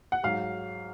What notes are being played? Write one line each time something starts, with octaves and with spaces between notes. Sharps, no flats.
F#5
G#2 F#3 F5